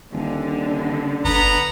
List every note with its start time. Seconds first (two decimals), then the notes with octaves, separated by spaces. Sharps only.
0.12 D#1 D3
1.25 G1 B3 A#5